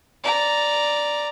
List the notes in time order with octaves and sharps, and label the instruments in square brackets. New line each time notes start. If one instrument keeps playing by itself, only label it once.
[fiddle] D5 A#5